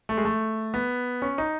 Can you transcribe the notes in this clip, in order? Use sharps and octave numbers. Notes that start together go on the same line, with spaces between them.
A3
G#3
A3
B3
C#4
D#4